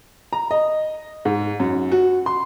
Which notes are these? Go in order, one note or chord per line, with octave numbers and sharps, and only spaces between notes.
A#5
D#5
G#2
F#2
F#4
C6